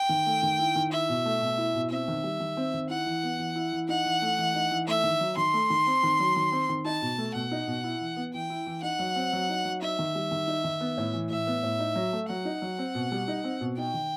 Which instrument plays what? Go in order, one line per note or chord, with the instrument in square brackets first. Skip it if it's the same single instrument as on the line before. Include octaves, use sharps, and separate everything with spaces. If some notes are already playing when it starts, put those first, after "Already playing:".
Already playing: [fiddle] G5
[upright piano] D#3
A3
D#3
E4
D#3
[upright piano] E4 [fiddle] E5
[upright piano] B2
A3
B2
E4
B2
[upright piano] C4 [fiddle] E5
[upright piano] D#3
G3
D#3
C4
D#3
[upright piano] E4 [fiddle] F#5
[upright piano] E3
B3
E3
E4
E3
[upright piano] D#4 [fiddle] F#5
[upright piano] E3
A3
E3
D#4
E3
[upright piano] A3 [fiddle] E5
[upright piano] D#3
F#3
[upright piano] D#3 [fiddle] C6
[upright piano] A3
D#3
C4
D#3
F#3
D#3
C4
D#3
[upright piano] D#4 [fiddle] A5
[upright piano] B2
A3
[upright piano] B2 [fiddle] F#5
[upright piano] D#4
B2
E4
E3
B3
[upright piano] E3 [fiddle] G5
[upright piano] E4
E3
[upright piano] D#4 [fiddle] F#5
[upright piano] F#3
C4
F#3
D#4
F#3
[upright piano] D#4 [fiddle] E5
[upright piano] D#3
G3
D#3
D#4
D#3
B3
A2
E3
[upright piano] A2 [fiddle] E5
[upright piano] B3
A2
D#4
F#3
A3
[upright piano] F#3 [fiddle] F#5
[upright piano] D#4
F#3
C4
B2
G3
D#4
C4
B2
[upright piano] D#4 [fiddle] G5
[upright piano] D#3